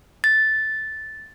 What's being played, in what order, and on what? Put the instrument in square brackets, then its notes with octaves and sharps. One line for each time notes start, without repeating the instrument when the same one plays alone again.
[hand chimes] A6